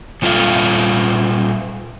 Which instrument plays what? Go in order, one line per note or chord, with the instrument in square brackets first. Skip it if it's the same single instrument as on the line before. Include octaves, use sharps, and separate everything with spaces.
[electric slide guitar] A#2 G3 F4 A4 E5 F5